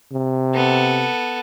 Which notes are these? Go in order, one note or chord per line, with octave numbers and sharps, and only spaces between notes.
C3
B3 A4